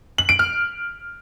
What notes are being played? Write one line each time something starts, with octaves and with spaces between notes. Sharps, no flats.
F#7
D7
F6